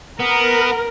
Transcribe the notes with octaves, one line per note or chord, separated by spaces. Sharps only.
B3 A#4